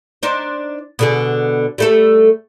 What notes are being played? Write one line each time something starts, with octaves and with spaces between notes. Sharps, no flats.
D4 D#4 C5
B2 D3 G#4
G3 A3 A4